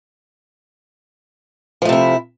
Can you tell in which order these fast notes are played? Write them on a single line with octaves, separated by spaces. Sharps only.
F3 A3 C3 E4